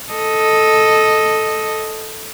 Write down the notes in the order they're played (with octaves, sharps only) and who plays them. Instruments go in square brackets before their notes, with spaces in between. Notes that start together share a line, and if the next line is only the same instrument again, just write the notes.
[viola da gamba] A4 D#5